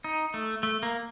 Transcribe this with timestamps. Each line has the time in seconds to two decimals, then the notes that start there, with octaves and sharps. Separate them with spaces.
0.04 D#4
0.34 A3
0.63 A3
0.83 A#3